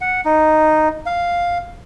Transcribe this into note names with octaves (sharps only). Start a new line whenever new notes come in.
F#5
D#4
F5